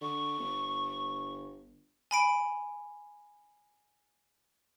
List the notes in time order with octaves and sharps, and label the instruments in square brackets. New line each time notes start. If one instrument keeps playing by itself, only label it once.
[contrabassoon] D3 [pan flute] C#6
[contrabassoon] G1
[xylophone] G#5 B5 D7